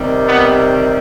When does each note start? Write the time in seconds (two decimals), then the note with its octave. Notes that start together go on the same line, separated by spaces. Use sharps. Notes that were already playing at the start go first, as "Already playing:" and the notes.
Already playing: C3 D#3 G3
0.28 B3